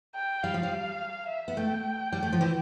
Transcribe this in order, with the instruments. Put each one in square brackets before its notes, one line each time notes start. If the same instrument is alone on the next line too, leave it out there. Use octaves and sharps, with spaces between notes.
[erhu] G5
[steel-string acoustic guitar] G3 [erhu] F5
[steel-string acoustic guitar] F3
G3
[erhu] E5
[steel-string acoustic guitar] B3
[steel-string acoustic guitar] A3 [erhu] G5
[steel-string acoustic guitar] G3
A3
F3
E3